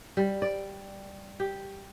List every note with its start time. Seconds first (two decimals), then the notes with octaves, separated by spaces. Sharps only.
0.17 G3
0.42 D5
1.40 G4